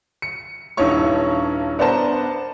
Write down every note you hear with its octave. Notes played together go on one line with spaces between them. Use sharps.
C#7
D#1 G2 D#4 E4 C#5 C#6
B3 D4 A#4 C5 A5